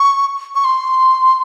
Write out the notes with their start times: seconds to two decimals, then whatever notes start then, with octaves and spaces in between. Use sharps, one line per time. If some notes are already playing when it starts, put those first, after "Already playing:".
Already playing: C#6
0.55 C#6
0.65 C6